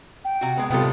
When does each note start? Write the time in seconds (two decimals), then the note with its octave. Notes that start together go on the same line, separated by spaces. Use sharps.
0.25 G5
0.41 C3 F#4
0.57 G#3 B3
0.70 C3 G3 B3 F4 A4